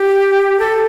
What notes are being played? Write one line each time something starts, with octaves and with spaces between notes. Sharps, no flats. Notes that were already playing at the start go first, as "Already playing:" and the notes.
Already playing: G4
A4